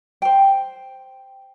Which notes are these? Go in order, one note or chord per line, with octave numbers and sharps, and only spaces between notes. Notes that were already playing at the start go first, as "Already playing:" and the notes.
C5 G5